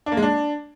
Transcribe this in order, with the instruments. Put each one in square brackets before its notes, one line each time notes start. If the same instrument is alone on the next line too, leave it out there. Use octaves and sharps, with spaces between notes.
[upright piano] D4
A#3
G#3
D4